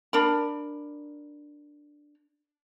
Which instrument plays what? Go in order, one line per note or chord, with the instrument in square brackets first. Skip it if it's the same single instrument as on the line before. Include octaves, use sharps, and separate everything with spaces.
[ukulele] D4 A#4 B5